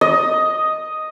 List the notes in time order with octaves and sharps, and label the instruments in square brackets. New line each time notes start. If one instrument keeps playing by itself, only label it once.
[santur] D#5